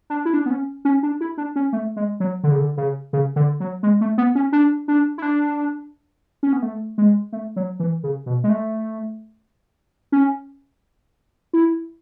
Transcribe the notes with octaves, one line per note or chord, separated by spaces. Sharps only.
D4
E4
D4
B3
C#4
C#4
D4
E4
D4
C#4
A3
G#3
F#3
D3
C#3
D3
C#3
C#3
D3
F#3
G#3
A3
B3
C#4
D4
D4
E4
D4
C#4
B3
A3
G#3
A3
F#3
E3
C#3
B2
G#3
A3
C#4
E4